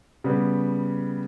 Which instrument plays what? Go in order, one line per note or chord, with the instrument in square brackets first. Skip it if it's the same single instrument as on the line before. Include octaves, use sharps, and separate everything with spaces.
[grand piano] C#3 G3 B3